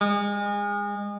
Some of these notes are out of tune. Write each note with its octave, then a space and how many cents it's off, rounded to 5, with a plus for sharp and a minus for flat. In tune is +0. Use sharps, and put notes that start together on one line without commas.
G#3 -30